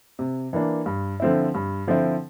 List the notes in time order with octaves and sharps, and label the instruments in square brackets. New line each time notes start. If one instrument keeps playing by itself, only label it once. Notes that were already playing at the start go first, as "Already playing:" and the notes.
[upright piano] C3
E3 A#3 D4
G2
D3 F3 C4 E4
G2
D3 F3 C4 E4